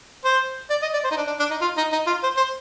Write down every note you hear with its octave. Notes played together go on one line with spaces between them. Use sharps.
C5
D5
D#5
D5
C5
D#4
D4
D4
D4
D#4
F4
D#4
D#4
F4
C5
C5